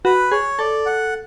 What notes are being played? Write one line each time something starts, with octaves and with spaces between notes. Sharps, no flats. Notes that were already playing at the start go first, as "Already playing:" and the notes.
F#4 B4
G#4 C#5
A4 D5
F#5